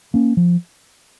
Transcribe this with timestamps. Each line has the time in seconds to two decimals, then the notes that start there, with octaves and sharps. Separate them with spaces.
0.14 A#3 C#4
0.37 F3